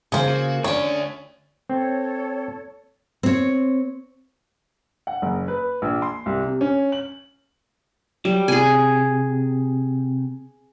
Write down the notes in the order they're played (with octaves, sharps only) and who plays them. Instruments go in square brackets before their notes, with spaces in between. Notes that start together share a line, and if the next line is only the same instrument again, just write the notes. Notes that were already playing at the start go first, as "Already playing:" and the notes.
[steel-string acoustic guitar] C#3 A#3 [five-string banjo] G#4 C5
[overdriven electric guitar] F#4
[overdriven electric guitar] D2 D5 [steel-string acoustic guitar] D3 C#4 [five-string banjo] C#5
[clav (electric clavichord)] C4 [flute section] A4 C#5
[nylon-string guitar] C4 C#5
[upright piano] F#5
F#1
B4
A#1
C6
C2
C3
C#4
F#7
[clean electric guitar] F#3 [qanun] G3
[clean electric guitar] C3 [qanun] G#4 G#5